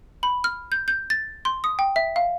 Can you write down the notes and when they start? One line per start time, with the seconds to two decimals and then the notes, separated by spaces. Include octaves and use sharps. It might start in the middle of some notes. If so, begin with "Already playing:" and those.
0.23 B5
0.44 F6
0.72 G6
0.88 G6
1.10 A6
1.45 C6
1.64 D#6
1.79 G5
1.96 E5
2.16 F5